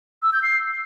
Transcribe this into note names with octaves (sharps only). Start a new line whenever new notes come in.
E6
G6
C7